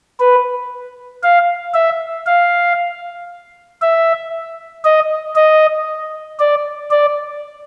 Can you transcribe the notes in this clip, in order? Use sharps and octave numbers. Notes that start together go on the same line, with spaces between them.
B4
F5
E5
F5
E5
D#5
D#5
D5
D5